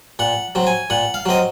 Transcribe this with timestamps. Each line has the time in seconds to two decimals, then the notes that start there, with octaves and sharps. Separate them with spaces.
0.19 A#2 F#5
0.55 F#3 C4
0.67 G#5
0.90 A#2 F#5
1.14 F5
1.26 F#3 C4 D#5